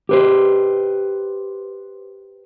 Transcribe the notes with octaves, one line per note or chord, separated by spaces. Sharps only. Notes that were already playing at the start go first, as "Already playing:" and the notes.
G4 B4 C5